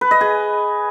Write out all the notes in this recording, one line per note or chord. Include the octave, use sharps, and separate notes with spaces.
B4
D#5
G#4